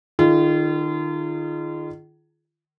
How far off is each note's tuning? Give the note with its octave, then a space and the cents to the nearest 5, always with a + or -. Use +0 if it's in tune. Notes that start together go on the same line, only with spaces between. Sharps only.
D#3 -35 F4 -35 G#4 +15